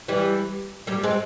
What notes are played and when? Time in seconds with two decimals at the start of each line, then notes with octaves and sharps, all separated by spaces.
0.08 E3 G3
0.87 G3 A#3
1.03 G#3 C4